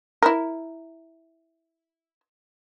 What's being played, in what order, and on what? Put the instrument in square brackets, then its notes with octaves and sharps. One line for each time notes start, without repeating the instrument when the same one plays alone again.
[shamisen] E4 A#4